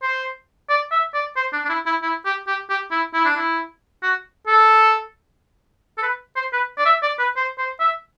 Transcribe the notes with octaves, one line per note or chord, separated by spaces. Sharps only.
C5
D5
E5
D5
C5
D4
D4
E4
E4
E4
G4
G4
G4
E4
E4
D4
E4
F#4
A4
A4
B4
C5
B4
D5
E5
D5
B4
C5
C5
E5